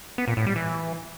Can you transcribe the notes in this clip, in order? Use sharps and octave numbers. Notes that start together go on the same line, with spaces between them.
B3
A#2
A2
G3
E3